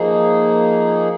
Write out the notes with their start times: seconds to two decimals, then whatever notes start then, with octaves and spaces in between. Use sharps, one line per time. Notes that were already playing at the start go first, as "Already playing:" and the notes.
Already playing: F3 A#3 D#4 G#4